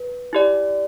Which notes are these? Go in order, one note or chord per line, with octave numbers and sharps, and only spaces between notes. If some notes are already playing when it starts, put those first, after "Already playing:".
Already playing: B4
E4 G4 D5